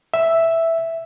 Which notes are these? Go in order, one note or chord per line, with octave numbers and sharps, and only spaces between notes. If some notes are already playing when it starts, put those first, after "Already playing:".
E5